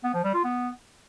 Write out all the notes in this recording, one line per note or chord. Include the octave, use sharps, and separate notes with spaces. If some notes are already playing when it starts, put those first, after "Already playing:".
B3
F3
G3
F4
B3